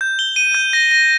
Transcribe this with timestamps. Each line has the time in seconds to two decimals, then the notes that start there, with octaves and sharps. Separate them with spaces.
0.01 G6
0.19 G7
0.36 D#7
0.54 G6
0.73 A#6
0.91 A#6